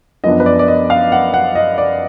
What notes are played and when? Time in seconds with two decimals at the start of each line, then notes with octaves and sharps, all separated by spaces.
0.24 F#2 F3 B3 D4 D#5
0.40 B4
0.46 D5
0.59 D5
0.68 D#5
0.90 F5
1.12 F#5
1.34 F#5
1.55 D#5
1.78 D5